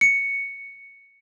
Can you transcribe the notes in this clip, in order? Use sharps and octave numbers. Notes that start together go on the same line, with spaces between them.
C#7